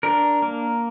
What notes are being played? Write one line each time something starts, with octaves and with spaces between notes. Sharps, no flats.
D4 A#4
A#3